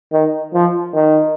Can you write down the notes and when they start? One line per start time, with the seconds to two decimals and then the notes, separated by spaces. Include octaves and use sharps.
0.13 D#3
0.54 F3
0.94 D#3